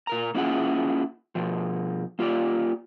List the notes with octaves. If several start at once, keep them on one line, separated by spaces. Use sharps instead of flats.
A#2 A#4 A#5
A#3 C#4 E4 F4 G#4 F#5
B2 F3
A#3 F4 G4 D5